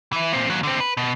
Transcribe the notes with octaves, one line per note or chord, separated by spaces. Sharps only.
E3 E4
A#2 C4
D#2 F#3
D3 C4
B4
B2